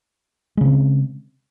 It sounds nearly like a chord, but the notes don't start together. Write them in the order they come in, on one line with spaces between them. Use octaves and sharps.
G#3 C#3 C4